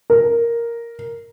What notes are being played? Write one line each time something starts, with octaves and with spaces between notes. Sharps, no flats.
A#4